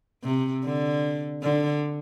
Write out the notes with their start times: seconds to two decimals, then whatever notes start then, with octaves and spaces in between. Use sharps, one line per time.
0.24 C3
0.64 D3
1.43 D3